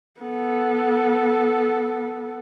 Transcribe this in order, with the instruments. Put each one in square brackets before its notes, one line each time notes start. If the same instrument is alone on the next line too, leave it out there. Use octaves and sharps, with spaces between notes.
[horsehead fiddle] B3 A4